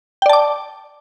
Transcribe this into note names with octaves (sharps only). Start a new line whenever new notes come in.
D5 G5 A5 D6